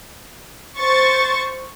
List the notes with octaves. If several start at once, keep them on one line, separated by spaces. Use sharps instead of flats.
C5 C#6 A6